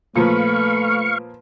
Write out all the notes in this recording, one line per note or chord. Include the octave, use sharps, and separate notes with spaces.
A#2 F3 A3 B4 F5 C#6